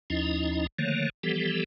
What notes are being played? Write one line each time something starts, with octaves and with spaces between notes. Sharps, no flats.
D#2 F3 C#4 D#4 E4 D#5
D3 D#3 F3 A3 A#3 C#5
E3 F3 G3 B3 G4 A4